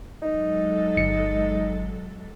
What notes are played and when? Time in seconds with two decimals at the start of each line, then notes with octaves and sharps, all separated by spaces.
0.22 F#3 G#3 D#4 A4
0.97 G1 C#7